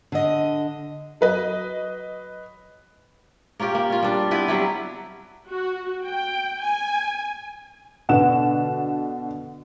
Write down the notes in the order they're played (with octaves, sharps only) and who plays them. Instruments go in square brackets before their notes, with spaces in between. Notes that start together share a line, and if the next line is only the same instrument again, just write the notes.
[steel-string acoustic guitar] D3 D#5
[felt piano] F#3 B4 D#5
[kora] A#3 C#4 F4 G4
A#3
C#4 F4
G3 D4
B3 C4 E4 B4
F#3 G3 E4
[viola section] F#4
G5
G#5
[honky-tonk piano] B2 D3 E7 [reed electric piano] F#5